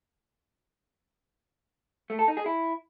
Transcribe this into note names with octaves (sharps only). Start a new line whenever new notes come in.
A3
A4
D#4
G#4
E4